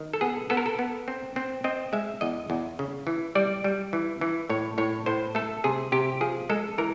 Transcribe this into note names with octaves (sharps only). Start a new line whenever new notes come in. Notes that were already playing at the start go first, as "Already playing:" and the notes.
Already playing: D#3
A4
B3 G#4
B3 A4
A#4
A4
B3
C4
C4
C4 D#5
G#3 E5
E2 D#5
E2
C#3
E3
G3 D5
G3
E3
E3
A2 C#5
A2 C#5
A2 C5
A3 A4
C3 G#4
C3 G4
F3 G#4
G#3 A4
E3 A#4